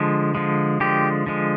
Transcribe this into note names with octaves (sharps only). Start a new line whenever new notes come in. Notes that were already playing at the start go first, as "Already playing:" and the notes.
Already playing: D3 F3 G#3
D3 F3 G#3
D3 F3 G#3 G4
D3 F3 G#3